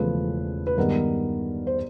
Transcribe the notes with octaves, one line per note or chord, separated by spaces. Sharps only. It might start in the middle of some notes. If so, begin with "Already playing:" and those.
Already playing: E1 E2 C#3 F3 A3 B4
B4
G2 D#3 G#3 B3 A#4
C5